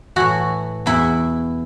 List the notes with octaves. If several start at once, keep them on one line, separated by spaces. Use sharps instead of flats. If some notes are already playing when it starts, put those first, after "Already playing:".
A2 E3 F#4
E2 B2 E4